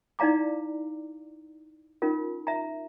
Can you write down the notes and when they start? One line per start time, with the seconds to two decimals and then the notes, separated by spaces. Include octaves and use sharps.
0.19 D#4 E4 D5 F5 A#5 D6
2.02 C#4 D#4 F4 A#4
2.47 E5 A#5